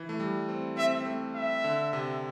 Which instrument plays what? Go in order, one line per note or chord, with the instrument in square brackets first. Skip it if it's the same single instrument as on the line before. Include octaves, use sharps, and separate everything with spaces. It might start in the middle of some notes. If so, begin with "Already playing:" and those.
Already playing: [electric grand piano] E3
A3
G3
C4
[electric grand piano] C4 [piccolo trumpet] E5
[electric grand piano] C4
A3
[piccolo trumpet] E5
[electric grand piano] D3
C3